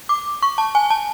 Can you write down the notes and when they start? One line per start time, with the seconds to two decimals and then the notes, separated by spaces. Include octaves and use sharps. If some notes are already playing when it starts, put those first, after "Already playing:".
0.09 D6
0.42 C#6
0.58 A5
0.75 G#5
0.90 A5